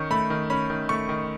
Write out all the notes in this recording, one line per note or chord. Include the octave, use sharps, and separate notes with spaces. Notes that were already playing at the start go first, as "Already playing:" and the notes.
Already playing: D#3 C#4 C#6
A3 B5
D#3
C#4 B5
D#3
A3 C#6
D#3